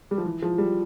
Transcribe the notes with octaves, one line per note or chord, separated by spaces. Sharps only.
G3
F3
E3
F3
G3